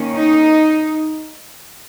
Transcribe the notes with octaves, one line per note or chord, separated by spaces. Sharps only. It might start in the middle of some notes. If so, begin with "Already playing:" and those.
Already playing: D#3 A#3 C#4
D#4